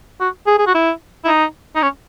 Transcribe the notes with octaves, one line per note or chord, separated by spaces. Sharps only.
F#4
G#4
G#4
F#4
E4
E4
D#4
D#4
C#4